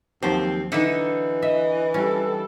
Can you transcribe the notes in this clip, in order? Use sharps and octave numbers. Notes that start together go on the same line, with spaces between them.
D#2 F3 F#3 C4
D3 E3 D#4 E5 F#5
D#5 E5
G3 C#4 A4